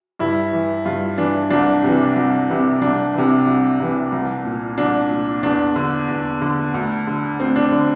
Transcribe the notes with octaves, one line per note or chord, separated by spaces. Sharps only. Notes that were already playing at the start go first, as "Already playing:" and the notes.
G2 E4
E3
G2 F4
E3 D4
C2 D4
C3 E3
C2
C3 E3
C2 D4
C3 E3
C2
C3 E3
C2
A#2
C2 D4
A#2
E2 D4
D3
E2
D3
D2
D3
D2 C4
D4
D3